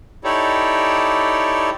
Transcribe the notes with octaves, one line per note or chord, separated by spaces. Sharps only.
D#4 E4 G4 A4 C#5 D5